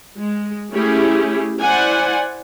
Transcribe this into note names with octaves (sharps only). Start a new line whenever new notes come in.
G#3
A3 C#4 E4 G4 G#4
E4 C5 D5 F#5 G#5